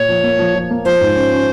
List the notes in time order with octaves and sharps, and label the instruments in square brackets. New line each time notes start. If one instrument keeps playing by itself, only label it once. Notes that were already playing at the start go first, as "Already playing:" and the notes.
Already playing: [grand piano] A#2 [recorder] C#5
[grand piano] F3
A#3
F3
F3
A#3
[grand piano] F3 [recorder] C5
[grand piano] G#2
C#4
C#4